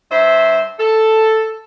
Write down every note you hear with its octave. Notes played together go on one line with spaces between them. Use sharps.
G2 C5 E5
A4